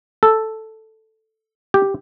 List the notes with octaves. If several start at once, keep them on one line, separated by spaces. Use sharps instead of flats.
A4
G4